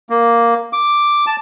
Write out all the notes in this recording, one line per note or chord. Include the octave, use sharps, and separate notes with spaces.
A#3
D6
A5